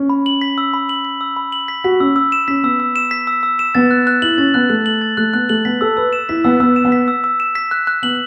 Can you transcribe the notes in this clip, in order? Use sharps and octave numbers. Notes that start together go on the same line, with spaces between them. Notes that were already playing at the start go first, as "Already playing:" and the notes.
Already playing: C#4
B5
F#7
B6
E6
B5
F#7
B6
E6
B5
F#7
B6
F#4 B6
C#4 E6
E6
E7
C#4 B6
B3 E6
E6
E7
B6
E6
E6
E7
B3 A6
F#6
F#6
E4 F#7
C#4 A6
B3 F#6
A3 F#6
F#7
A6
A3 F#6
B3 F#6
A3 F#7
B3 B6
A4 E6
B4 E6
E7
E4 B6
B3 E6
B3 E6
E7
B3
B6
E6
E6
E7
B6
F#6
F#6
B3 F#7